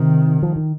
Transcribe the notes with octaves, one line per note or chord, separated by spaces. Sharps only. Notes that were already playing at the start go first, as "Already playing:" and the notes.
Already playing: C3 D#3
F3
D#3